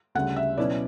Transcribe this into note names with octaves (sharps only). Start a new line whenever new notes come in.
D2 C#3 G3 F#5
E5
B2 F#3 C#4 E4 D5